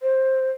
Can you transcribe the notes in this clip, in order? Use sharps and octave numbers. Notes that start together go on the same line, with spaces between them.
C5